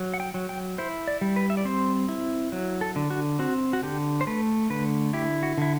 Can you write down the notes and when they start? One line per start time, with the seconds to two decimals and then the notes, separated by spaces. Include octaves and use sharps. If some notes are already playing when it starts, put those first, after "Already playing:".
Already playing: F#3
0.14 F#5
0.20 G5
0.34 F#3
0.49 G5
0.78 E4 C5
1.07 D5
1.21 G3
1.36 B4
1.50 E5
1.57 D5
1.65 C4 C5
2.09 E4
2.52 F#3
2.81 A4
2.96 D3
3.10 F#4
3.39 C4 F#4
3.73 F#4
3.83 D3 G4
4.21 C5
4.27 A3 B4
4.70 D3 B4
5.13 E4 G4
5.43 F#4
5.58 D3 E4